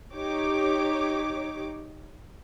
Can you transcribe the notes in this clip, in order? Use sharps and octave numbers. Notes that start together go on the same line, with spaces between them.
D#4 G4 C#5 D6